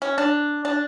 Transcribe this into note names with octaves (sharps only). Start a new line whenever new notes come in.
C#4
D4
D4